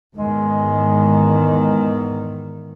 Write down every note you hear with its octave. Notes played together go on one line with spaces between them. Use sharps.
E2 G#2 D#3 G#3